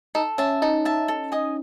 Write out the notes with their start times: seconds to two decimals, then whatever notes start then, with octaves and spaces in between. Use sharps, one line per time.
0.15 D#4 A4
0.38 C#4 E5 A5
0.62 D#4 A4
0.85 E5 A5
1.08 A4
1.32 D#5 G#5 D#6